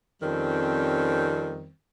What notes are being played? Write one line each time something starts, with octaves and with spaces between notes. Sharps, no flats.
F2 D#3 G3 C4 C#4